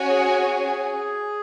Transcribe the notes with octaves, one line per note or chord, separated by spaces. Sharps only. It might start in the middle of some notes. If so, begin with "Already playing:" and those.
Already playing: C#4 F#4 C#5 G#5
G#4